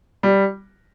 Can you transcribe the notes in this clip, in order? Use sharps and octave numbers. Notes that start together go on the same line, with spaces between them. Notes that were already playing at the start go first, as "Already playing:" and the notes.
G3